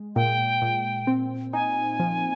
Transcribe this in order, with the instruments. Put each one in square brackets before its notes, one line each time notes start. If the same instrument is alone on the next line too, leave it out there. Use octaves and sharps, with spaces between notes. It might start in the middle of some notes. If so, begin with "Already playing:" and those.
Already playing: [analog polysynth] G#3
[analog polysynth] A#2 [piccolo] G5
[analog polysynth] A#2
C4
[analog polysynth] D#4 [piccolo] G#5
[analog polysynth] F3